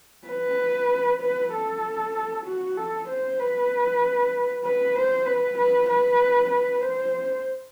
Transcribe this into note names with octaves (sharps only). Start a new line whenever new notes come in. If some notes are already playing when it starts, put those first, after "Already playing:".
B4
B4
A4
F#4
A4
C5
B4
B4
C5
B4
B4
B4
B4
C5